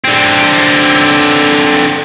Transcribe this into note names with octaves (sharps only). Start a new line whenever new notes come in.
D3 C4